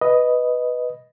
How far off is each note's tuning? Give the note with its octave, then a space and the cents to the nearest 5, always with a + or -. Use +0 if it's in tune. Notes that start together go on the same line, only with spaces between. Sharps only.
B4 +0 D#5 +0